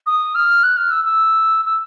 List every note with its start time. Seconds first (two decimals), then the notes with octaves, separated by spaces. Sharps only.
0.06 D#6
0.35 F6
0.63 F#6
0.77 F6
0.91 E6
1.05 E6
1.65 E6